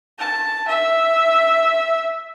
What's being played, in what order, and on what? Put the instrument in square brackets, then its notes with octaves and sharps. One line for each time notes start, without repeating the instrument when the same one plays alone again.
[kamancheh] A5
E5